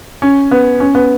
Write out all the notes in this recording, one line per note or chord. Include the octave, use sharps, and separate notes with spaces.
C#4
B3
C#4
B3